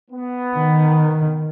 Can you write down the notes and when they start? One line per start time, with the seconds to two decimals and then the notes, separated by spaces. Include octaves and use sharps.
0.11 B3
0.57 D#3